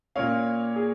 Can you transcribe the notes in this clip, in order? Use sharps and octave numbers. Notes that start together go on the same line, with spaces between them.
A#2 A#3 C#4 F5
G#4